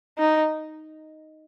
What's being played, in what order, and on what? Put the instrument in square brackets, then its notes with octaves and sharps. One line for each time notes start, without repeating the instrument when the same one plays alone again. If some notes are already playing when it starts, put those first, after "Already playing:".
[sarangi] D#4